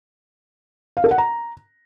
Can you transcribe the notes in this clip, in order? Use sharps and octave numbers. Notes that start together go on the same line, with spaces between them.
F5
A4
F#5
A#5